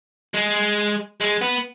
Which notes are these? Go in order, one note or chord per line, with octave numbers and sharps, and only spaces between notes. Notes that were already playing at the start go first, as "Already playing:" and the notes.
G#3
G#3
B3